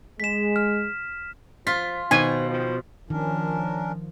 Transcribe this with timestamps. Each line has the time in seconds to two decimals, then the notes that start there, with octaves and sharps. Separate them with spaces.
0.20 G#3 B6 E7
0.56 F6
1.67 F3 F4 B6
2.11 B2 D#3 C5 G#5
2.50 F3
3.10 D#3 F3 C#4 D4 A#4